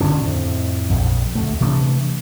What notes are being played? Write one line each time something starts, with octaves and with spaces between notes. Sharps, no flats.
B2 D3 C#4 D4
F2 A2
A#1 F2
D2 F#3 A3
C3 E3 A3 D4